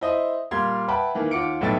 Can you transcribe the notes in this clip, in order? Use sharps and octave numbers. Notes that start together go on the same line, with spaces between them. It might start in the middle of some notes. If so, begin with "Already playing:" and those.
E4 C5 D#5 E5 D#6
A#2 G3 F5 C6 G#6
B4 E5 F#5 G5 A5 B5
D#3 E3 A#3
D#2 F4 F#5 D6 C#7 D7
B1 A2 B3 E5 G5 A6